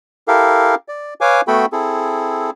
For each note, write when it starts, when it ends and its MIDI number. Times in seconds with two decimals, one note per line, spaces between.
0.28 0.75 64
0.28 0.75 67
0.28 0.75 69
0.28 0.75 70
0.28 0.75 77
0.88 1.14 74
1.21 1.41 71
1.21 1.41 73
1.21 1.41 77
1.21 1.41 80
1.21 1.41 86
1.48 1.66 57
1.48 1.66 59
1.48 1.66 66
1.48 1.66 69
1.48 1.66 79
1.48 1.66 83
1.72 2.50 60
1.72 2.50 64
1.72 2.50 68
1.72 2.50 69